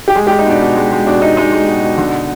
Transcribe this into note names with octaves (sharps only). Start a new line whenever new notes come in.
G4
G#3 G#4
G#3 G4
D#4
B2 D4
B2
G#3
G#3
B2 D4
B2 D#4
G#3 D#4
G#3
B2
B2
D3